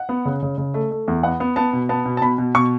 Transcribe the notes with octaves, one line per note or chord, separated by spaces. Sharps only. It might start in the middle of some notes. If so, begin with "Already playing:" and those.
Already playing: F#5
B3
C#3
C#3
C#3
A3
A3
E2
B3 F#5
B3
B3 A5
B2
B3 A5
B2
A5
B2 B5
B2
B2 C#6